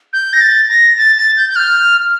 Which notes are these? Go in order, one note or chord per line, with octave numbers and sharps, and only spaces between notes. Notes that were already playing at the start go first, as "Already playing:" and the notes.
G6
A#6
A6
A#6
A6
A6
G6
G6
F6